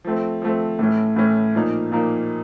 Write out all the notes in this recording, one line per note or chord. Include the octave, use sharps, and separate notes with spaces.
F3 A3 C4
F3 A3 C4
A2 E3 A3 C#4
A2 E3 A3 C#4
A#2 F3 A#3 D#4
A#2 F3 A#3 D#4